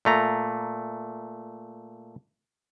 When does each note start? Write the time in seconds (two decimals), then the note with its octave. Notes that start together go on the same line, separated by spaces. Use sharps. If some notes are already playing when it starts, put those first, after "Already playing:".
0.05 A#2 A3 A#5